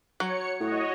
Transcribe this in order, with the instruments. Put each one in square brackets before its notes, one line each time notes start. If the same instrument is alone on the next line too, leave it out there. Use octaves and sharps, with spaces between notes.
[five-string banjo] F#3 [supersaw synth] C#5 C#7
[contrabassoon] A2 [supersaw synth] F#4 C#5 D#5